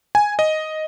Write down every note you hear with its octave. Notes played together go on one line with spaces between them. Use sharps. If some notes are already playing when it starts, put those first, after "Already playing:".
G#5
D#5